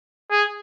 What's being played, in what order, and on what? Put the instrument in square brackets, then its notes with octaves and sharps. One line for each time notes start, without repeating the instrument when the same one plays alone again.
[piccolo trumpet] G#4